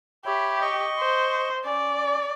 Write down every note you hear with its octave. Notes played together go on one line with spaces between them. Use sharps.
G4 C#5 E5 B5
D#5 C#6
C5
C#4 D5